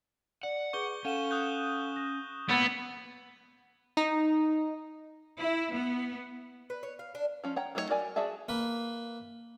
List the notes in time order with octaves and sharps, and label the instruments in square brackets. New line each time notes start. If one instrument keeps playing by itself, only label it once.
[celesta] D5 [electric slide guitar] F#5
[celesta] G#4 B4 D6 [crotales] C#6 G6 G7
[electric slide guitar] C#4 [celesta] A4 F5 F#5 [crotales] D#7 E7 G7
[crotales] D#6 F#6 G6
[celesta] A#6
[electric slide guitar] A2 A#3 [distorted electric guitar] B3 [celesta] F#5 E6 [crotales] G#6 A6
[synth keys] D#4
[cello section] E4
B3
[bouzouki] B4
C#5
F5
D4
[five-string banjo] F3 C#4
C#5 F#5 G5 A#5
F#3 A3 D#4 E4 C#5
F#4 A#4 D5 G#5
F#4 G#4 D5 E5 A5
[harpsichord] A#3 B4